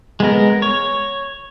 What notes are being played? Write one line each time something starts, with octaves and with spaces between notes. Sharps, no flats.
G#3 B3 A#4
C#5